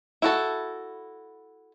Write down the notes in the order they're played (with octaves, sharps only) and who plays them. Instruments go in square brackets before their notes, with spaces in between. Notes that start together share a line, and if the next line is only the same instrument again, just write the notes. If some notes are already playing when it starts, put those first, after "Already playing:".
[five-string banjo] E4 F#4 A4